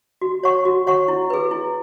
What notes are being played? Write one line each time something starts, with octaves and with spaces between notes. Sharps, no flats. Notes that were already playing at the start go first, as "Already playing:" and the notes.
F#4
C#5 F#5 C#6
F#4
C#5 F#5 C#6
E4
G#4 B4
E4